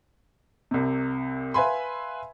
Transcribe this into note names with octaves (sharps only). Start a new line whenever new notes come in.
C2 C3
B4 E5 F5 G#5 B5 C6